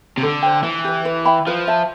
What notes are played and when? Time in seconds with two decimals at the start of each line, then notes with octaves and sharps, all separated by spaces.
0.18 C3
0.22 D3 A4
0.43 C5 G5
0.63 E3 E4
0.84 G4 B4
1.05 B4
1.25 E5 G5 B5
1.47 F3 B4
1.68 E5 A5